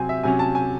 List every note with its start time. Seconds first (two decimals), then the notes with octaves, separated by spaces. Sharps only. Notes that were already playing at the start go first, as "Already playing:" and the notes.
Already playing: C3 F#3 C4 G#5
0.09 E5
0.23 C3 F#3 C#4 G#5
0.39 A5
0.55 G#5